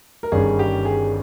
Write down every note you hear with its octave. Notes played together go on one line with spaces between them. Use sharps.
A#4
G1 G2 D#3 G3 C#4 G#4
G4
G#4